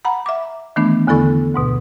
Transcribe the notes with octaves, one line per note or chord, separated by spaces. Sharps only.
F#5 A#5 B5
E5 D6
D#3 E3 A3 B3 D4
E2 D3 B3 E4 A4 C#6
D2 G#2 B2